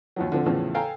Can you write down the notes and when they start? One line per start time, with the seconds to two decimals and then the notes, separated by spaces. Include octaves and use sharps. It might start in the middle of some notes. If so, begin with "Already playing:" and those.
0.16 D#2 F3 F#3
0.32 D3 F3 C4
0.46 E2 A2 C#3 E3 F3
0.74 A4 F5 G5 G#5 A#5